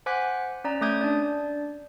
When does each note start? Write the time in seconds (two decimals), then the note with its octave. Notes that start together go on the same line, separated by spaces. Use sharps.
0.06 C5 F#5 G#5 D6 F#6 B6
0.64 C#4 D5 A#5
0.81 A3 C#4 D6 D#6 G6 G#6
1.01 D4 D5